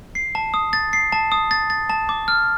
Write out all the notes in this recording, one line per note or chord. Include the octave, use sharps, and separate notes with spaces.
C7
A5
D#6
A6
C7
A5
D#6
A6
A6
A5
D6
F6